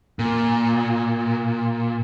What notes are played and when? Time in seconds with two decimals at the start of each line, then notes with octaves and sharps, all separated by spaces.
0.19 A#2